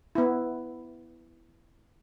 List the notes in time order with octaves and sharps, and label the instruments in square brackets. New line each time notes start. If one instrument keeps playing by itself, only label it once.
[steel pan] B3 E4